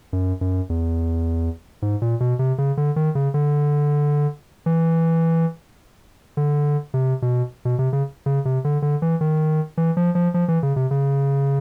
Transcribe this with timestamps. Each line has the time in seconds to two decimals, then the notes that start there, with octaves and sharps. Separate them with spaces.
0.13 F#2
0.41 F#2
0.70 E2
1.82 G#2
2.02 A#2
2.20 B2
2.39 C3
2.58 C#3
2.77 D3
2.96 D#3
3.15 C#3
3.34 D3
4.66 E3
6.37 D3
6.94 C3
7.22 B2
7.65 B2
7.79 C3
7.93 C#3
8.26 C#3
8.45 C3
8.65 D3
8.82 D3
9.02 E3
9.21 D#3
9.77 E3
9.97 F3
10.15 F3
10.34 F3
10.48 E3
10.63 C#3
10.76 C3
10.91 C#3